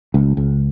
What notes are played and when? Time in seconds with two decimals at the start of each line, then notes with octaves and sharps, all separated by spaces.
0.14 C#2
0.37 C#2